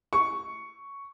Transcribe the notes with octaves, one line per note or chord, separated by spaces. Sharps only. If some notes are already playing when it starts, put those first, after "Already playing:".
C#6